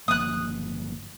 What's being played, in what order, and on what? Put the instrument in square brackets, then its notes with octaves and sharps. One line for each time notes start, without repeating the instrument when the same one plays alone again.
[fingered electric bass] G1 F3 A#3 [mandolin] D#6 F#6